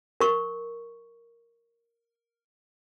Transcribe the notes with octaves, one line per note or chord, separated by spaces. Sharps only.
A#4 C#6